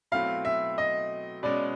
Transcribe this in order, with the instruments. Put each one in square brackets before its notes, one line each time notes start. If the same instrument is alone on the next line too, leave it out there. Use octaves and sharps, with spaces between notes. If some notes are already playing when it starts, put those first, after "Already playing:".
[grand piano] B2 F#3 A3 C4 E4 [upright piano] F5
[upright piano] E5
D#5
[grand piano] B2 G#3 C#4 [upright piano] D5